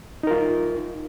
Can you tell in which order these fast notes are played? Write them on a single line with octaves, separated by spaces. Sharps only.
D#4 A#4 F4